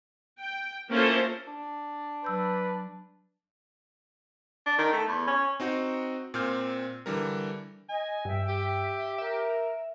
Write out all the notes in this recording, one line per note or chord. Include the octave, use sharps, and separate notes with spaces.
G5
A#3 C#4 E4 F4 A4 C5
D4
F#3 B4 E6 G6
D4
D#3
A3
E2
C#4
C4 D#4 F#4
A#2 C4 F6 G6
D3 E3 G3 A#4
D#5 G#5
G2 E5 G5 E6
G4
A#4 E5